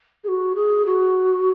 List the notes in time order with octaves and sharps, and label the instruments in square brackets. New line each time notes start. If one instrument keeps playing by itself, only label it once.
[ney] G#4
F#4
G#4
F#4